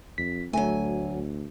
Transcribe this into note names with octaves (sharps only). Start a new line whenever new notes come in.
F2 B6
D2 F#3 A3 G#5